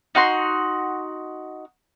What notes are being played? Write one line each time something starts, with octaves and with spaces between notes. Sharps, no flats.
D#4 F#4 C6